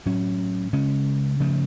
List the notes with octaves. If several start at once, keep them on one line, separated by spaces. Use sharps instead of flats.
A2 F#3 C#4
C#3 G#3 C#4
C#3 F3 A3